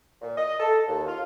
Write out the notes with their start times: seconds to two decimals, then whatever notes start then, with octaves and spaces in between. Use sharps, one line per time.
0.22 A#2
0.37 D#5
0.59 A4
0.87 D#2
1.06 F4